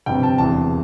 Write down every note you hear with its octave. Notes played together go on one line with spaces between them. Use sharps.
G1 F2 C3 G5
A5
E1 E2 C3 A5